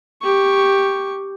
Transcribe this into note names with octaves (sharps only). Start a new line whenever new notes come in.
G4 C#6